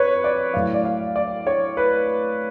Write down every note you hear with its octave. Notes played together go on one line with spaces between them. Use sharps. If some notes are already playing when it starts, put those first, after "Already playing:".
Already playing: F2 B4 C#5
D5
A2 F#3 F5
D5
F5
D5
C#5
B4